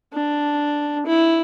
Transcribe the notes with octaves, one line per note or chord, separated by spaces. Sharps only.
D4
E4